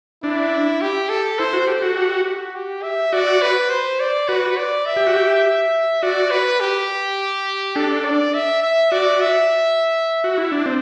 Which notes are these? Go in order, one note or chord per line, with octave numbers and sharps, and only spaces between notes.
D4 E4
G4
A4
E4 C5
F#4
G4 A4
F#4
G4
F#4
G4
E5
F#4 D5
B4
C5
D5
F#4 B4
D5
E5
G4
F#4
G4
F#4 D5
B4
G4
D4 A4
D5
E5
E5
F#4 D5
E5
F#4
E4
D4
C4